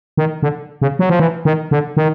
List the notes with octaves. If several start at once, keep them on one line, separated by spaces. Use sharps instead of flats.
D#3
D3
C#3
F#3
F3
E3
D#3
D3
D#3